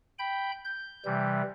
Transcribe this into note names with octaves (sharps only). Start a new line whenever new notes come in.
G5 B5 G6
G6
C3 E3 G3